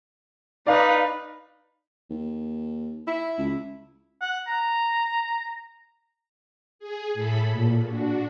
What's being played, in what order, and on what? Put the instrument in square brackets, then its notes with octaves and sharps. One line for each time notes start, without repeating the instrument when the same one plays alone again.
[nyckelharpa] D#4 B4 [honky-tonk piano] D5 F5
[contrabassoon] D#2
[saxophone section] E4
[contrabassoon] C#2
[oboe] F#5
A#5
[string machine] G#4
A2 A4 B5
A#2
D4 F#4